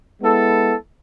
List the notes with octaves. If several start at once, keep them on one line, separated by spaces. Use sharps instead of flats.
G#3 B3 E4 A4